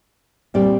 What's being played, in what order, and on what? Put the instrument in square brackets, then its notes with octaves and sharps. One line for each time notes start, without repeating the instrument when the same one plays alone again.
[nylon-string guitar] A#2 G3 C4 G4 D5